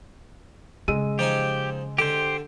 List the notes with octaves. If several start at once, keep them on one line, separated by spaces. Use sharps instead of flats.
C#3 G#3 E6 D#7
F3 D#4 G4 G#5
D3 G4 C5